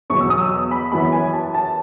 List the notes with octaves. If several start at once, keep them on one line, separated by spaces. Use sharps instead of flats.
E2 B2 F#3 C#6
E6
D#6
E6
B5
F#2 E3 B3 B5
G#5
A5
A5